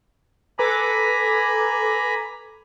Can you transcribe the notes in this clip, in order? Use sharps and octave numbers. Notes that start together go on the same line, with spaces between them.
A4 B4 G#5 A#5 B5 D6